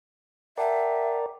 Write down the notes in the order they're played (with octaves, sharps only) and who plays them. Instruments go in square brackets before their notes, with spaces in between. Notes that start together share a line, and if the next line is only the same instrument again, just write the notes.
[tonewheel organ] A#4 D5 [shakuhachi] E5 [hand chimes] F#5 G5 A5